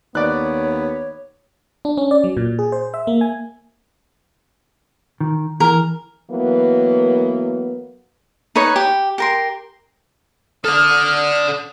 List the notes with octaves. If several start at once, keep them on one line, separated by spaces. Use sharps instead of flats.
D#2 B3 C#5 D5 F#6
D4
C#4
D5
F#3
A#2
G#4
C5
E5
A#3
G#5
D#3
E3 A#4
E3 F#3 A#3 B3
D#4 B4 C#5
G4
G4 A#4 C6
A4 D5 D#6 F6